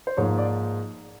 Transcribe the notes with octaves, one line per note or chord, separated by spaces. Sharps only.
C5
G#2 F3 A#3 C#5
D5